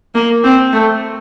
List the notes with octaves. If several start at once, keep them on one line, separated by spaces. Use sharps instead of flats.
A#3
C4
A3